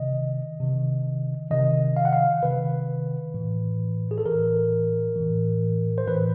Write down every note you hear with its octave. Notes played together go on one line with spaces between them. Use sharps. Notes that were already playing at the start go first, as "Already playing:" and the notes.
Already playing: C3 D#3 D#5
C3 D#3
C3 D#3 D#5
F5
F#5
F5
C3 D#3 B4
A2 E3
G#4
A4
A2 E3 A#4
A2 E3
C5
A2 E3 B4